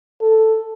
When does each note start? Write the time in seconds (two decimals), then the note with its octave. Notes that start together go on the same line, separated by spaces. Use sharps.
0.21 A4